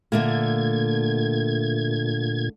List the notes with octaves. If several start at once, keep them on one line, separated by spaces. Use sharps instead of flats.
A#2 D3 A3 A#3 G#6